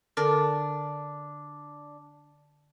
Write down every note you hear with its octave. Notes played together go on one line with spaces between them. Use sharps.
D3 D4 A4 A#4